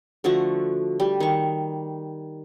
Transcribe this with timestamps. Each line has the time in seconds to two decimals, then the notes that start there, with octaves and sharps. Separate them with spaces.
0.24 D3 F3 A3 F#4
1.00 G3
1.20 D#3 C#6